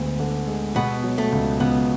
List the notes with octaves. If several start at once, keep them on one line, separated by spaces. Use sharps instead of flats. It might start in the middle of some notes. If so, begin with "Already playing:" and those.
Already playing: D2 G#3 B3
D3
G#3
B2 B3
F#3
A3
C#2
C#2 B3